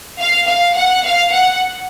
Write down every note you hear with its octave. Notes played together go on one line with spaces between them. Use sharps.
F5
F5
F#5
F5
F#5